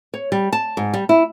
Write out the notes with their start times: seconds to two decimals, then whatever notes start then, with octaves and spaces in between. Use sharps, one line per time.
0.14 C#5
0.32 G3
0.52 A5
0.77 G#2
0.94 G3
1.09 E4